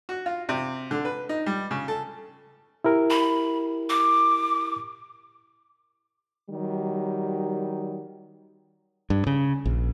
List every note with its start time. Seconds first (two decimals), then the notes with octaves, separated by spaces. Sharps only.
0.09 F#4
0.26 F4
0.49 C3
0.91 D3
1.05 B4
1.29 D#4
1.46 G3
1.71 C#3
1.88 A4
2.84 E4 G4 A#4
3.10 B5
3.90 D6
6.50 D#3 F#3 G3
9.10 G2
9.27 C#3
9.65 A#1